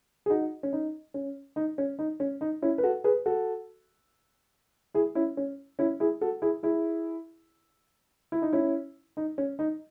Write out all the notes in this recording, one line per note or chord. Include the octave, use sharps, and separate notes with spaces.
G#4
D#4 F#4
C#4
D#4
C#4
D#4
C#4
D#4
C#4
D#4
C#4 E4
B4
F#4 A4
G#4 B4
F#4 A4
E4 G#4
C#4 E4
C#4
C#4 E4
E4 G#4
F#4 A4
E4 G#4
E4 G#4
E4
D#4
C#4 E4
D#4
C#4
D#4